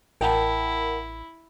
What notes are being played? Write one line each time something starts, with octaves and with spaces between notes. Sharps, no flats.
A1 E4 A#4 F#5 G5 A5